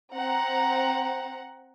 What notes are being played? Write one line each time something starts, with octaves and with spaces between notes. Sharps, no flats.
C4 F#5 A#5